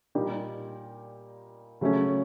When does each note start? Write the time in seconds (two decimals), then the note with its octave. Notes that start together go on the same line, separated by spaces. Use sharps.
0.15 A#2 G3 A#3 D#4 G4
1.81 C#3 F#3 A3 C#4